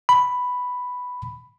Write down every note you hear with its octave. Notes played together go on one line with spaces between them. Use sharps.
B5